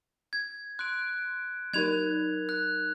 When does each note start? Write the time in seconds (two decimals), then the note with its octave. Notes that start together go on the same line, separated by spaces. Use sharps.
0.33 G#6
0.79 C6 F#6 D7
1.74 F#3 D#4 A#4 G#6 F7
2.49 F#6